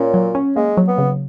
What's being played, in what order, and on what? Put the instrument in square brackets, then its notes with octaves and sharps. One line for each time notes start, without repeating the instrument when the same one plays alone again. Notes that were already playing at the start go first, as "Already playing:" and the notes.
Already playing: [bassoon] A#2 [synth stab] C#4
[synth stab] F#3
C#4
[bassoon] G#3 [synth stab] A#3
[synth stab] F#3
[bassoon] B3
[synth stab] C#3